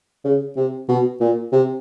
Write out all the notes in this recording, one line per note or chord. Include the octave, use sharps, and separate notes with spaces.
C#3
C3
B2
A#2
C3